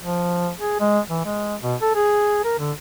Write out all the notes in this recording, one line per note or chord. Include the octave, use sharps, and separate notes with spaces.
F3
G#4
G#3
E3
G#3
B2
A4
G#4
A#4
D3